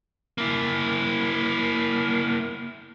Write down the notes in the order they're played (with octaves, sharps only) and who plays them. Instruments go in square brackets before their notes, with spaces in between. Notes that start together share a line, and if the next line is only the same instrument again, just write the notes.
[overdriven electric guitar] A#3 E4